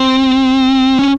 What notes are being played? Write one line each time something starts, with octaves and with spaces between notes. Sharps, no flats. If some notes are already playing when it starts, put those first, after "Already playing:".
Already playing: C4
C#4